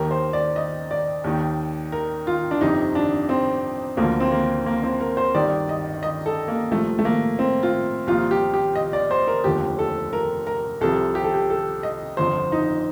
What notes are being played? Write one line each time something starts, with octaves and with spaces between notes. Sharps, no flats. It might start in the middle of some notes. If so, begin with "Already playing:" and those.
Already playing: D#2 D#3 A#4
C5
D5
D#5
D5
D#2 D#3
A#4
F4
D4
G1 F2 C3 D#4
D4
C4
D2 D3 F3 A#3
C4
A#3
A#3
C4
A#4
C5
G1 G2 D#3 D5
D#5
D#5
A4
A#3
C2 A#2 F3 A3
A3
A#3
C4
F4
C2 A#2 F3 F4
G4
G4
D#5
D5
C5
A#4
F1 D#2 D3 F3 G4
A4
A#4
A#4
C2 C3 F3 A4
G4
A4
G4
A4
D#5
G1 F2 D3 F3 C5
D#4